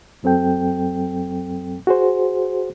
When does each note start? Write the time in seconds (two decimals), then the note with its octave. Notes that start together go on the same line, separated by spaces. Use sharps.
0.23 F#2 F#3 C4 A4 G5
1.87 F#4 G#4 C5